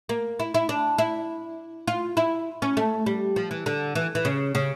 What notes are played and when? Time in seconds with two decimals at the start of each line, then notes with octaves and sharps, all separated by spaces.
0.09 A#3
0.39 E4
0.54 E4
0.69 D4
0.98 E4
1.87 F4
2.17 E4
2.62 C#4
2.77 A3
3.06 G3
3.36 F3
3.51 E3
3.66 D3
3.95 E3
4.15 E3
4.25 C#3
4.55 C#3